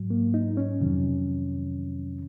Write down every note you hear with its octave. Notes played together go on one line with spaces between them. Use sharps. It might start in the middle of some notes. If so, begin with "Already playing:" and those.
Already playing: G#2 F#3
A#3
D#4
C#4
F2 C3 D#3 F#3